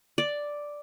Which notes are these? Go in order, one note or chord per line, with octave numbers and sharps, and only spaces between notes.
D5